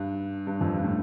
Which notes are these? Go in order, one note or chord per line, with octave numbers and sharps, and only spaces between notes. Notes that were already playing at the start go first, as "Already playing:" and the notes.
Already playing: G2
G2
F2
G2
A2